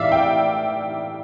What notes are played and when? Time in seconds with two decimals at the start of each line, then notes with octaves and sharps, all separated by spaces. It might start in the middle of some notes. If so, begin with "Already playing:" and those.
Already playing: A2 E3 D5 E5 F5
0.12 G5